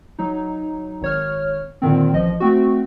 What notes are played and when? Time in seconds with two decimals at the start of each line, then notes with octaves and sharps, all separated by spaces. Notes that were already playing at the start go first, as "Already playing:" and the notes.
0.19 F#3 D#4
1.02 G#1 C#5 F6
1.82 A#2 D3 D#3 C4
2.13 A1 F3 D#5
2.40 A3 C4 F#4